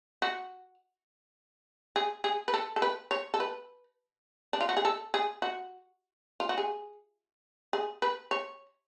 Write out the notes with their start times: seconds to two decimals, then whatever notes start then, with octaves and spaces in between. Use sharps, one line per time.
0.22 F#4
1.96 G#4
2.24 G#4
2.48 B4
2.54 A4
2.76 A4
2.82 B4
3.11 C#5
3.34 A4
3.40 B4
4.53 D4
4.61 F4
4.69 F#4
4.77 G#4
4.85 A4
5.14 G#4
5.42 F#4
6.40 F4
6.49 F#4
6.58 G#4
7.73 G#4
8.02 B4
8.31 C#5